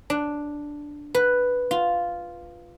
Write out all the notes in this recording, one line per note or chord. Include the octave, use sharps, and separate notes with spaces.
D4
B4
F4